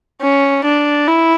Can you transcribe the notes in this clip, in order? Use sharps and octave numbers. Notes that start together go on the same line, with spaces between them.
C#4
D4
E4